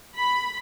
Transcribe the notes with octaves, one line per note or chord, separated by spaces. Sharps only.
B5